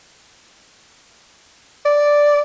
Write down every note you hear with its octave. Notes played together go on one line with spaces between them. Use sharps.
D5